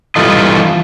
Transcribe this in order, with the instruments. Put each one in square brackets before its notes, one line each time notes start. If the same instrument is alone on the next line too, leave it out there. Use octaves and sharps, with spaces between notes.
[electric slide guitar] E3 G3 F4 A4 D#5